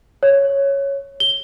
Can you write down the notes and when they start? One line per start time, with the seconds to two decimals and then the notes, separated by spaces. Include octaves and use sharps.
0.23 C#5
1.20 G7